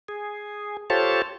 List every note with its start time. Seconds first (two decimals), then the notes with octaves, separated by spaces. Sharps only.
0.08 G#4
0.90 F4 G4 A4 C5 C#5 A5